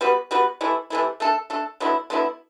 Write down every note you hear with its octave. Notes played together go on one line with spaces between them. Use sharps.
G3 B3 F#4 B4
G3 B3 F#4 B4
C3 E3 A3 E4
C3 E3 A3 E4
A3 D4 A4
A3 D4 A4
D3 F#3 B3 E4
D3 F#3 B3 E4